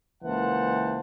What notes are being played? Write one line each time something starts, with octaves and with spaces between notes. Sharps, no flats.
C#2 E3 A#3 C5 F#5 A5